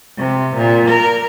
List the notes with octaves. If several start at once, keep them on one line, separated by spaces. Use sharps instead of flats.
C3
A#2
A#4